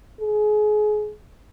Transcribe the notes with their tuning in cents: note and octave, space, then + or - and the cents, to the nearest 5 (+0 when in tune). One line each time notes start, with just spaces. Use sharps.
G#4 +30